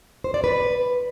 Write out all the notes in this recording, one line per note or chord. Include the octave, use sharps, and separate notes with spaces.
C5
D5
B4